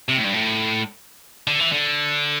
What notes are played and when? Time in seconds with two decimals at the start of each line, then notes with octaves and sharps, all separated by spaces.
0.09 C3
0.17 A2
0.25 G2
0.33 A2
1.47 D3
1.60 E3
1.72 D3